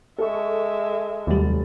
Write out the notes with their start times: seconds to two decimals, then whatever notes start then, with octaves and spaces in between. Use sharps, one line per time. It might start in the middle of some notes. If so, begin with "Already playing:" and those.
0.18 G#3 A4 E5 C#6
1.27 F1 D#2 F#3 G3 A6